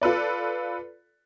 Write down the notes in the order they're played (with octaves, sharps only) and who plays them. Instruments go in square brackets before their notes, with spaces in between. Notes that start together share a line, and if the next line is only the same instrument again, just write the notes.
[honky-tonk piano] F4 A4 B4 D5